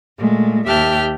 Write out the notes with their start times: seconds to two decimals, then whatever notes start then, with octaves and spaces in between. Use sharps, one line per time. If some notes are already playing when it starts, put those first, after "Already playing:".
0.18 A#2 G#3 A3
0.66 D#2 G4 E5 G5 A5 F6